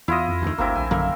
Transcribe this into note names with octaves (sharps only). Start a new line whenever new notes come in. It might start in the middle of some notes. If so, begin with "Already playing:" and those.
E2 E4 F4 D#5
F2
D2 D#3
G1 D2 A#3 C4 E4
A#1 G#5
F#2 D3 D#3 A#3